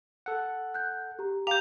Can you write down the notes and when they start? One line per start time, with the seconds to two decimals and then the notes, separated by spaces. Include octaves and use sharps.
0.26 A4 F#5
0.74 F#6 G6
1.19 G4 A#5
1.47 G4 F5 A#5 G6 F7